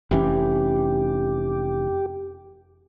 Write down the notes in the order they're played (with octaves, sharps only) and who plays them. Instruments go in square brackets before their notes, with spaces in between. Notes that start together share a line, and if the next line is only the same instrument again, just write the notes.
[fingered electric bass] F1 E3 C#4 [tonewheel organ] G4